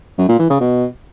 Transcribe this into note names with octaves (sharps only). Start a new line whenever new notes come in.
F#2
A#2
E3
C#3
B2